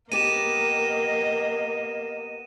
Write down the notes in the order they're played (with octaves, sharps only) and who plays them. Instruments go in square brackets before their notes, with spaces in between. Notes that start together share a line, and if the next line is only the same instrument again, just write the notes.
[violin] A#3 [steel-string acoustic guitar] B3 G4 [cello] D#5 [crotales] D#7 E7